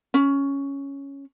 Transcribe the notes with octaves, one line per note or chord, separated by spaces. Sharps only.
C#4